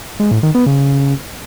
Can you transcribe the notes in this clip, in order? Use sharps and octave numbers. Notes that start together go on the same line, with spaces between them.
G#3
A2
D#3
B3
C#3